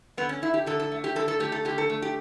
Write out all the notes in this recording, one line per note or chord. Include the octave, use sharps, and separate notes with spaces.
D3 B3
C#4
A3 E4
G4
D3 A4
A4
A3
G4
D3 A4
A4
A3 G4
A4
D3 G4
A4
A3
G4